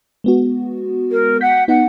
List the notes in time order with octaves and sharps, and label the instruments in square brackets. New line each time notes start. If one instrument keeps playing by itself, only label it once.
[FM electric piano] G#3 B3 F#4
[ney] A#4
[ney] F#5 [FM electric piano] G6 B6
[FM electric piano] B3 D#4 [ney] F#5